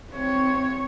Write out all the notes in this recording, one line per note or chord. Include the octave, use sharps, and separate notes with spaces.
C4 C#5